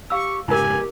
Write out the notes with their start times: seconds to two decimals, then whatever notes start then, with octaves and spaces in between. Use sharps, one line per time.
0.10 G4 F5 C#6 E6
0.48 F1 G#2 C#3 E4 G4 A#4 G#5